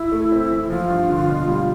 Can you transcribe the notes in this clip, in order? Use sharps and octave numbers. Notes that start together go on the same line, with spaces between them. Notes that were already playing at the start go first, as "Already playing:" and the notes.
Already playing: E4
A3
C4
E3
F3 F4
G2
D3
B2
G3